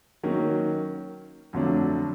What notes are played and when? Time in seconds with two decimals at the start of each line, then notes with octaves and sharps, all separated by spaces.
0.23 D#3 F#3 A#3 C#4
1.53 F2 D3 F#3 A3 D4